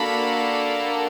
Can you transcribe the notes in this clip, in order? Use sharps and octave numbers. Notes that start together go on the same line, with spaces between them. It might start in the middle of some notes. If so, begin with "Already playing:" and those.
Already playing: A#3 D4 F#4 A4 B5